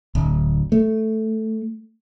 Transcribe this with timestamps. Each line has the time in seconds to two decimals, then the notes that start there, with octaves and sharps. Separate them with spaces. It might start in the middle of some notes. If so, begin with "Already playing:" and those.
0.15 D1
0.72 A3